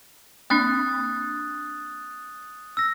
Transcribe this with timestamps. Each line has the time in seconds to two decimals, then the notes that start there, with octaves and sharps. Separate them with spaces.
0.50 A#3 C4 D4 D#6 F#6 A6
2.77 E6 A#6